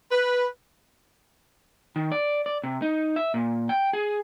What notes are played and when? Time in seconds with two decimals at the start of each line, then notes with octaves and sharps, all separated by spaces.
0.11 B4
1.96 D#3
2.12 D5
2.46 D5
2.64 C3
2.82 D#4
3.16 E5
3.34 A#2
3.69 G5
3.93 G#4